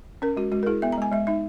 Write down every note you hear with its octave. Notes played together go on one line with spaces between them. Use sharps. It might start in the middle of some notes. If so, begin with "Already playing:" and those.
C#4 A#4
G#3 F#4
G#3 F#4
A#4
E4 G#4
B3 E5
A#5
G#3 G#5
G#3 E5
D#4 E5